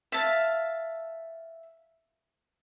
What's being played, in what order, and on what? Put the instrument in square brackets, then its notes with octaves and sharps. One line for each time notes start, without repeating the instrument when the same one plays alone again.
[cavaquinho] E5 F5 A5